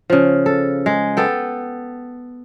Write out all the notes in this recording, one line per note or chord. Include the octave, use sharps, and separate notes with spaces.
C#3 F3
A4
G#3
B3 A4 G5